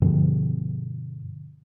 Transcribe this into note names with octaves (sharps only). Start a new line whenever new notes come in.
G2 B2 D3 F3